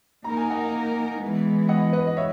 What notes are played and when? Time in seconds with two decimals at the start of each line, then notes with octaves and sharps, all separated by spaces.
0.24 A#3 D#4 A#4 A#5
0.37 G#5
0.50 D#5 F#5
1.21 E3 G#3 B3
1.69 D#5 F#5
1.93 B4 D#5
2.07 D#5
2.17 C#5 E5